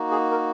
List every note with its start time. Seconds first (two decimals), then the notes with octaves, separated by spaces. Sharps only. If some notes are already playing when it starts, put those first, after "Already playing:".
Already playing: A#3 D#4 F#4
0.11 G#4
0.31 A#4